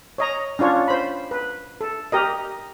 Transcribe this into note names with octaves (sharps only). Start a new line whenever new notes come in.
C#5 D#5 A#5
C#4 D4 F4 C#5
C5 B5
B4
A4
G4 A#4 D#5